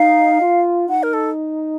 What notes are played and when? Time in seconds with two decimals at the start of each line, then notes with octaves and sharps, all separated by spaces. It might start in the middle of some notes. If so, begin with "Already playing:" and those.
Already playing: D#4 F5
0.41 F4
0.89 D#4 F#5
1.03 A#4
1.13 A4